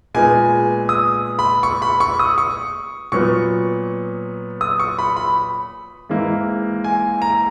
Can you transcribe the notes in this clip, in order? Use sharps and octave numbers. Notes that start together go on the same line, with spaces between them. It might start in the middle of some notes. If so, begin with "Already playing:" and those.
A#2 G#3 B3 G#5
D#6
B5
C#6
B5
C#6
D#6
C#6
A#2 F#3 B3 C#6
D#6
C#6
B5
B5
G#2 E3 A#3
G#5
A#5